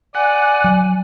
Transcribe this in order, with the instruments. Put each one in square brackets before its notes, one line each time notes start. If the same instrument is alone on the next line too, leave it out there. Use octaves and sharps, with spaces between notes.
[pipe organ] D5 [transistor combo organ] F#5 [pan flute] G#5
[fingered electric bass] F#3